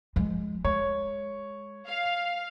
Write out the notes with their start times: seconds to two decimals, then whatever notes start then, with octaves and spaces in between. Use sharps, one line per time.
0.16 F3 G#3
0.65 G#3 C#5
1.87 F5